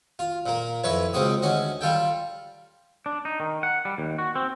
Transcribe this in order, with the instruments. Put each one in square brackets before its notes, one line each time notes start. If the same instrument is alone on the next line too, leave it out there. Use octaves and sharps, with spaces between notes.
[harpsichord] F4
A#2 A#3
F2 E4 B4 C#5
C#2 C#3 C4 F#4 D#6
D2 C#4 F#4 D#5
G3 F4 A4 G5
[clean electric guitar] D4
D#4
D#3
F#5
G3
D#2
F#4
C4